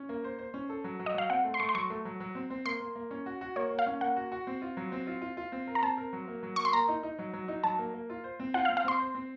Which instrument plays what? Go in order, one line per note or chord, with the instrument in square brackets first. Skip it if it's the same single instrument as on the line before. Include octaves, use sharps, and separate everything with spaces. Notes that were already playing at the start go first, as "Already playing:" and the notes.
Already playing: [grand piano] C#4
A#3
C5
C5
C#4
A4
F#3
F#3
[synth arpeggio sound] D#5
[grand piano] F#3 [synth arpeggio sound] F5
[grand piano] C4 [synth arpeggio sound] F#5
[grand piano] A3
[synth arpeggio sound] C6
[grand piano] A3 [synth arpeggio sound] C#6
[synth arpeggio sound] C6
[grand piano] F#3 [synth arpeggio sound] C#6
[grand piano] A3
F#3
F#3
C4
C4
[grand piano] A#3 [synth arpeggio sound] C6
[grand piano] A#3
A#3
C#4
F#4
F#4
[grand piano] A#3 [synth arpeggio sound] C#5
[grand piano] A#3
[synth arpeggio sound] F5
[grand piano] C#4
[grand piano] A#3 [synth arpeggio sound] F#5
[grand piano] F#4
F#4
C4
F4
F#3
C4
F4
F4
F4
C4
A#4
[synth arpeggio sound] A#5
[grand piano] C4 [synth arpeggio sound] A5
[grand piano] A#4
F#3
A#3
F#3
[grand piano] A#3 [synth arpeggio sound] C#6
[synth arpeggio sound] C6
[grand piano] A#3 [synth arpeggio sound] A#5
[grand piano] D#4
D#4
F#3
F#3
D#4
[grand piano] F#3 [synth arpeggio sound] A5
[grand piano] A#3
A#3
F4
C5
C4
[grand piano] F4 [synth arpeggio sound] F#5
[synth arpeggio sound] F5
[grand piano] C4
[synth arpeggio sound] F5
[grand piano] C4 [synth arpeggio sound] C6
[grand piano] C5
C4